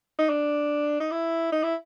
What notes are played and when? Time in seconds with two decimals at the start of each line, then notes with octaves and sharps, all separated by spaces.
0.19 D#4
0.30 D4
1.00 D#4
1.11 E4
1.52 D#4
1.63 E4